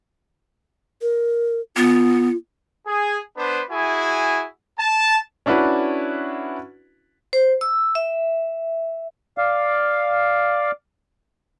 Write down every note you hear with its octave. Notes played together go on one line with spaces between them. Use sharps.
A#4
B3 F4
G#4
B3 D4 B4 C5
E4 F#4 G#4 G#5
A5
C#4 D4 E4 F#4 B4
C5
E6
E5
D5 F5